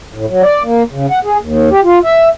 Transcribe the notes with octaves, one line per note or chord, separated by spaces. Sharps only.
A2
F#3
D5
A#3
C#3
F#5
G#4
D#2
G4
F4
E5